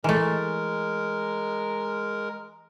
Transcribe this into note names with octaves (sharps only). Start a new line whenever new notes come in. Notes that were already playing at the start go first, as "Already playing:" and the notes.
E3 G#3 A3 A#4